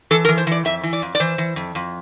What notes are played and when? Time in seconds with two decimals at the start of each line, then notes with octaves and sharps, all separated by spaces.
0.11 E3 A4
0.25 A#4
0.29 E3
0.38 C5
0.47 E3 D5
0.65 F2 E5
0.83 E3
0.93 D5
1.02 F2
1.15 D5
1.20 E3 C5
1.38 E3
1.56 F2
1.75 F2